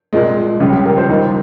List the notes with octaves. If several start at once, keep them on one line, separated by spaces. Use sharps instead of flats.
C2 A#2 G#3
C#2 C#3 G3 F4
G4
A#4
C5
D#2 D#3 G3 D#4